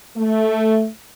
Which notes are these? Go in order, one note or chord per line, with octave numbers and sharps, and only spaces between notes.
A3